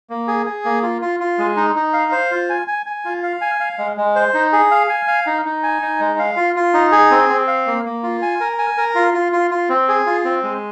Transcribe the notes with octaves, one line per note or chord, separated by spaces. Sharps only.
A#3
G#4
G#4
A#3
F4
F4
F4
G#3
D#4
D#4
F5
C5
F4
G#5
G#5
G#5
F4
F5
G#5
F5
G#3
G#3
C5
D#4
G#4
F5
G#5
F5
D#4
D#4
G#5
D#4
G#3
F5
F4
F4
D#4
G#4
C4
C4
F5
A#3
A#3
F4
G#5
A#4
G#5
A#4
F4
F4
F4
F4
C4
G#4
F4
C4
G#3